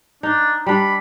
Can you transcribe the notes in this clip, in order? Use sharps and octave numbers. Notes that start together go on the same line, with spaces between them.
D4 D#4
G3 D4 B5